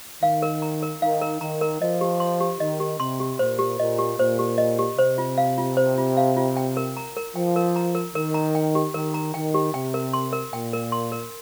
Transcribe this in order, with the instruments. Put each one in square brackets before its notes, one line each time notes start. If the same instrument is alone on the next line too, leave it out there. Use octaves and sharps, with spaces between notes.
[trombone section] D#3 [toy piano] F5
[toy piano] A#4
A#5
A#4
[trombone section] D#3 [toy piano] F5
[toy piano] A#4
[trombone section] D#3 [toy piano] A#5
[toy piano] A#4
[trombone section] F3 [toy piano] D#5
[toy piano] G4
C6
G4
[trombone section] D#3 [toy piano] D#5
[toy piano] G4
[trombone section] C3 [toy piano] C6
[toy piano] G4
[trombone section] A#2 [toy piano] C5
[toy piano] G4
[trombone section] A#2 [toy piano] D#5
[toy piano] G4
[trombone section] A#2 [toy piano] C5
[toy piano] G4
D#5
G4
[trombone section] C3 [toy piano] C5
[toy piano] F4
F5
F4
C5
F4
F5
F4
G5
A#4
A#5
A#4
[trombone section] F3 [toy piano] G5
[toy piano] A#4
A#5
A#4
[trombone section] D#3 [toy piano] A#4
[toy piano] A#5
G5
G4
[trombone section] D#3 [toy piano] A#4
[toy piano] A#5
[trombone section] D#3 [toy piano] G5
[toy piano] G4
[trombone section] C3 [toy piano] G5
[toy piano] A#4
C6
A#4
[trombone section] A#2 [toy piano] G5
[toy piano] A#4
C6
A#4